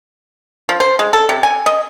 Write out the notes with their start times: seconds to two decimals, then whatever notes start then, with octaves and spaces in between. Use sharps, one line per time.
0.69 F3
0.80 C5
0.99 G#3
1.13 A4
1.29 C3
1.43 G#5
1.66 D#5